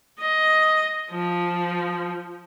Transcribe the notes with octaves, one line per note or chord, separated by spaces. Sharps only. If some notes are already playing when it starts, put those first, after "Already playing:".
D#5
F3